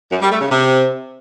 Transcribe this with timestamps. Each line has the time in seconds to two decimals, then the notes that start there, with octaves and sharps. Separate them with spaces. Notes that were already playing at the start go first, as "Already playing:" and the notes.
0.11 F#2
0.21 G3
0.31 A3
0.41 C#3
0.51 C3